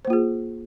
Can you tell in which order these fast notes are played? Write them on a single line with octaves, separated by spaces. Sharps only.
C5 A#3 F4 G#4